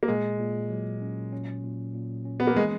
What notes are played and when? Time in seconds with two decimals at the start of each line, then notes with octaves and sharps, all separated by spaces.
0.03 A#3
0.08 A#2 G#3
0.40 A#2
0.70 F#3
1.01 C#4
1.32 C#4
1.64 A#2
1.94 A#2
2.25 C#4
2.40 B3
2.47 A#3
2.56 E3 G#3